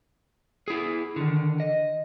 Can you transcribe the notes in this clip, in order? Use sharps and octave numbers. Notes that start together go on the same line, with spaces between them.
E4 G#4
D3 D#3
D#5